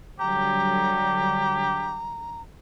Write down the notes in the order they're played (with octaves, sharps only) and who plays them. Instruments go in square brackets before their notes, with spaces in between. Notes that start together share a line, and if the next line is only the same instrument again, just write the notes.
[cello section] D3 F#3 G3 [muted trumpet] G4 [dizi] A#5